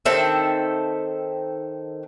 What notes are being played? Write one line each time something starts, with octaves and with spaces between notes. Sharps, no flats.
D#3 C4 A4 E5